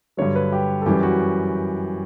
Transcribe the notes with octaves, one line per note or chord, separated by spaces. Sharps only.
G2 D3 F#3 C#5
B4
G4
A4
F#2 E3 G3 G4
F#4